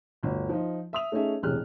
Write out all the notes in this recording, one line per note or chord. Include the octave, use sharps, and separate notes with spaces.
G1 D2
F3 D#4
E5 D#6 F7
A3 C#4 D#4 G#4 E5
E1 A1 C3 G#4 F6 F#6